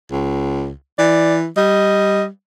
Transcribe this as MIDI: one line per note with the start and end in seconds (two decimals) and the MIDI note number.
0.11 0.70 37
0.98 1.47 52
0.98 1.35 74
1.57 2.28 55
1.57 2.23 75